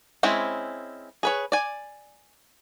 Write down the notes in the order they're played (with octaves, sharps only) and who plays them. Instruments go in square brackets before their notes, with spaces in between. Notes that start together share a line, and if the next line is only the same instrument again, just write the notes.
[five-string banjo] G#3 C4 C#4 E4
G#4 B4 C#5
D5 G#5